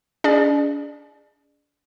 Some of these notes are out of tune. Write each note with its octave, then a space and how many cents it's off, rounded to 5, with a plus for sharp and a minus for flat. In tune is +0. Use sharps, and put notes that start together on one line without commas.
D4 -40 G#4 +0 D5 +35